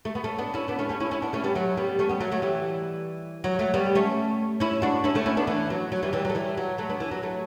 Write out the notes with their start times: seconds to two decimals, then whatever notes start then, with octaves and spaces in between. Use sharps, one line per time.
0.05 A3
0.15 B3
0.24 A3 C#4
0.39 B3 D4
0.54 C#4 E4
0.68 B3 D4
0.79 A3 C#4
0.89 A3 C#4
1.00 C#4 E4
1.11 C#4 E4
1.22 B3 D4
1.33 A3 C#4
1.44 G3 B3
1.55 F#3 A3
1.77 G3 B3
1.99 A3 C#4
2.09 G3 B3
2.20 F#3 A3
2.32 F#3 A3
2.42 E3 G3
3.44 F#3
3.59 F#3 A3
3.74 G3 B3
3.95 A3 C#4
4.60 C#4 E4
4.82 D4 F#4
5.04 C#4 E4
5.15 A3 C#4
5.26 C#4 E4
5.37 B3 D4
5.47 E3
5.70 F#3
5.92 F#3
6.03 E3 G3
6.13 E3 G3
6.25 F#3
6.30 A3
6.35 E3 G3
6.57 F#3
6.78 F#3 A3
6.89 B3 D4
7.00 E3
7.11 F#3
7.23 F#3 A3